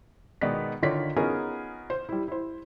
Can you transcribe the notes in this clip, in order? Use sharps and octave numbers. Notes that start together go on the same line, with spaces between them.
B2 D#3 G#3 B3 D5 B6
D3 D#3 F4 C#5 D5 B6
B3 C#4 D#4 F4 G#4 A#4
C5
G3 E4
E4 C5